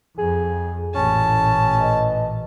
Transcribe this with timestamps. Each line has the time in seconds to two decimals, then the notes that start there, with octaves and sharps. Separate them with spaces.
0.18 F2 G#4
0.95 A1 A#2 C#4 A5
1.80 B4 D#5